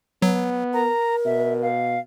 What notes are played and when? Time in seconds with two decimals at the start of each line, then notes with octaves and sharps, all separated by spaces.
0.22 F#3 B3
0.74 A#4 A#5
1.25 B2 E5
1.62 F5